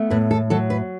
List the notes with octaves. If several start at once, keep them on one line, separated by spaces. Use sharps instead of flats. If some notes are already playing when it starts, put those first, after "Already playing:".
Already playing: A3 B3
A2 B4
A4
F#3 A4
B4